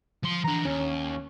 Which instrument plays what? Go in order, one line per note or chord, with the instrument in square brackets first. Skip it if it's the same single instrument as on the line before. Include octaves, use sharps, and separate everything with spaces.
[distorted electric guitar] F3 C6
[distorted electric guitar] E3 D4 [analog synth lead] A#5
[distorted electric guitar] D#2 [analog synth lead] C#4